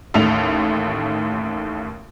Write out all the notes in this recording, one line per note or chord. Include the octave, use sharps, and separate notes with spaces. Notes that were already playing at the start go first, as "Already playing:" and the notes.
A1 D#2 A3 F7